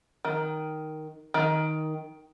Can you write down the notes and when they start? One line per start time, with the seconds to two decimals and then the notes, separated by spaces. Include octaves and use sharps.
0.25 D#3
1.34 D#3